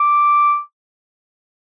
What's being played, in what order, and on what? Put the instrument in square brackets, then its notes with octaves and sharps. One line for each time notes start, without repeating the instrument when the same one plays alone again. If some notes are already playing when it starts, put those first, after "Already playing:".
Already playing: [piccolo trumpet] D6